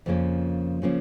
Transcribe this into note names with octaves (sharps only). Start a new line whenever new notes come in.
F2 C#3 F3 A#3 C#4
C#3 F3 A#3 C#4